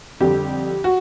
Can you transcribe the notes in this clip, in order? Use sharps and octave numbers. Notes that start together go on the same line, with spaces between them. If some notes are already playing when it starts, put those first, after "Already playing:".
F2 D3 G3 G4
F#4